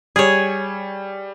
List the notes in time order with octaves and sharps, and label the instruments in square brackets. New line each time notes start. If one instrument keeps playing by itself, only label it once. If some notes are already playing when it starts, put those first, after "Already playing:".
[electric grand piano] G3 [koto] G#4 C#5